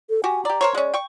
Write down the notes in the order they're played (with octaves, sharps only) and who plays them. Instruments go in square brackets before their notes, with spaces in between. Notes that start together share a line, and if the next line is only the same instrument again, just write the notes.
[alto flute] A4
[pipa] F#4 G4 [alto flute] G#5
[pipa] G4 D5 [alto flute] A#5
[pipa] A#4 C5 C#5
[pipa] G#3 C#4 [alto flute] D5
[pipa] G5 C#6